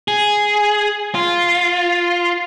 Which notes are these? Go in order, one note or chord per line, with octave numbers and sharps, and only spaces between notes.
G#4
F4